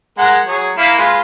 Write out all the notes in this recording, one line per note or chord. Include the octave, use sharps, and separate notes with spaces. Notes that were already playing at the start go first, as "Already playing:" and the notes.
G#3 A#4 F#5
F#3 G#4 C#5
A#3 E4 F5
G#3 F4 B4